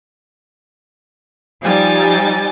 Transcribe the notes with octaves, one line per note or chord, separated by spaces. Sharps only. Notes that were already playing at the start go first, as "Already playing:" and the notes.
F3 G3 D#4 G5 G#5 A6